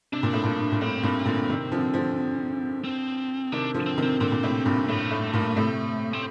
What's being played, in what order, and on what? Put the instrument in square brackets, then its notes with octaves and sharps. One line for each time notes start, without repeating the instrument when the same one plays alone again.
[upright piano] C3 [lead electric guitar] D4
[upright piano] A#2
A2
G2 A#2
A#2
[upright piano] A2 [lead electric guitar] C4
[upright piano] G2 A#2
A#2 D3
C3 D#3
D3 F3
D3 F3
[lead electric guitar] C4
[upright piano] C3 D#3 [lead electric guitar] D4
[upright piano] D3 F3
[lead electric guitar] C4
[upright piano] C3 D#3
[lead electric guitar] C4
[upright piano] A#2 D3 [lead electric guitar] C4
[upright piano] A#2
A2 C3
G2 A#2
[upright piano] A2 [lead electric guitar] A3
[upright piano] A2
G2 A#2
A2 C3
[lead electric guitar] C4